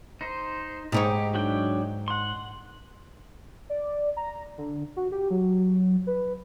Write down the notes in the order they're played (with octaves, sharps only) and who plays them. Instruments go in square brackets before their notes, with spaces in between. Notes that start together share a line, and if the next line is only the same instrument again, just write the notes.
[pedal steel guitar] D#4 C5
[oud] G#2 D#4 C#5 [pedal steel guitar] G4
[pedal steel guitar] F#3 D4 G5
F#5 C6
[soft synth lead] D5
A#5
D3
F#4
G4
F#3
B4